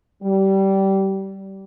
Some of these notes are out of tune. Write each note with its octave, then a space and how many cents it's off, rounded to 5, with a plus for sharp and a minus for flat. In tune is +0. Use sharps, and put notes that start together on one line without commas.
G3 -20